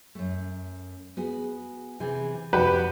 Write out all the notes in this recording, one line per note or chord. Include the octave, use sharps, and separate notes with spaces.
F#2 A3
B3 F#4 G#4
C3 E3 G#4
F2 A3 F#4 G4 B4